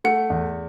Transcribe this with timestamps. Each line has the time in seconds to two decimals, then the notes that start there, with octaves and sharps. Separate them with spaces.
0.04 A3 F#5
0.30 E2